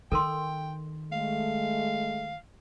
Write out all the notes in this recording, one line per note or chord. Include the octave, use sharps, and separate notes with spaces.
D#3 A4 A#4 G5 C6
G#3 A3 F5